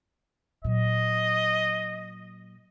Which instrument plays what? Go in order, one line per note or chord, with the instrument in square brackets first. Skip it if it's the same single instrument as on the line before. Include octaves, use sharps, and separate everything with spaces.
[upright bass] A#2 F#3 [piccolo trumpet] D#5